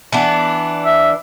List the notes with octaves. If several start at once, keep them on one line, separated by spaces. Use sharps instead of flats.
E3 B3 D4
E5